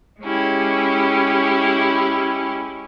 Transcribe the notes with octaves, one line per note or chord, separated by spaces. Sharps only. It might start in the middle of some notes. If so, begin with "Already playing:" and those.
G#3 C#4 E4 G4